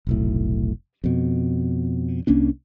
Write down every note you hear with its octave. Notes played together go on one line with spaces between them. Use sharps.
F1 B1 A2
F2 B2
C2 A#3 C#4 D4